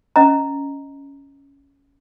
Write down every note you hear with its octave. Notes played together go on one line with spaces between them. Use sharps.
C#4 D#5 A#5